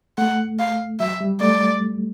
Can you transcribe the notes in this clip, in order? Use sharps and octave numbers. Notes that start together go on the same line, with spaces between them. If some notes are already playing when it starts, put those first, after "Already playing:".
A3 F#5
F5
F#3 E5
G3
A3 D5